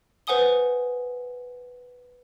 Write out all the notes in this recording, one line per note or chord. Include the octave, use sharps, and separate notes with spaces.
B4 C5 F#5 G#5 D#6 G7